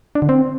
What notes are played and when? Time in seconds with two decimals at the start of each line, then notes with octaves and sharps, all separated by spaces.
0.15 D4
0.22 D3
0.29 C4